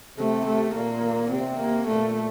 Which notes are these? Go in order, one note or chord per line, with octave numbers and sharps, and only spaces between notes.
C3 A3
A3
A#2 A#3
C3 C4
A#3
A#2 A3